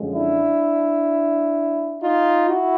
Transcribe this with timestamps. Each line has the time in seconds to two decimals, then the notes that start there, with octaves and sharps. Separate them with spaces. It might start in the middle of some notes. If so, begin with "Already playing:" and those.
Already playing: F#2 D3 F3 G#3
0.14 D4 E4
2.00 D#4 F4
2.47 E4 F#4